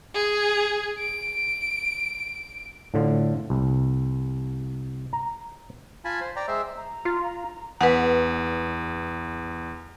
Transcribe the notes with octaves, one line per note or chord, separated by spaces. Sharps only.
G#4
D7
A2 D3 F4
C2
A#5
F4 G#5 A5 B5
C5
D5 G5 A#5
G#3 C5 E5
A#5
F4
E2 B4 F#5